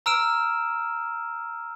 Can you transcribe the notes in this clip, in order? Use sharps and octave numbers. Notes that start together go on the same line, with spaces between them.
A#5 E6 F6 D7 E7